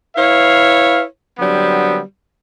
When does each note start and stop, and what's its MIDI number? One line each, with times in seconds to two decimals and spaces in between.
0.16 1.02 64
0.16 1.02 71
0.16 1.02 73
0.16 1.02 77
1.39 2.00 50
1.39 2.00 54
1.39 2.00 55
1.39 2.00 59
1.39 2.00 60